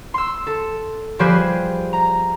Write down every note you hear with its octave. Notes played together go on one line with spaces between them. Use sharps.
C6 E6
A4
F3 G3 G4 G#4 B4 C5
A#5